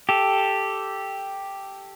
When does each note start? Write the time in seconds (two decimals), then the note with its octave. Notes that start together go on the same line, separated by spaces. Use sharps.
0.09 G4 A4